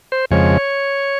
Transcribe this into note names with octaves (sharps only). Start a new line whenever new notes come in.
C5
F2 C#3 F3 G#3 C#5